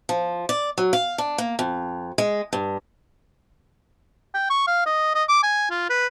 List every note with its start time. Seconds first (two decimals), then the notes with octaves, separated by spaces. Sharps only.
0.09 F3
0.49 D5
0.78 F#3
0.93 F5
1.18 D4
1.38 A#3
1.59 F2
2.18 G#3
2.53 G2
4.34 G5
4.50 C#6
4.67 F5
4.86 D#5
5.15 D#5
5.28 D6
5.43 G#5
5.70 F4
5.90 B4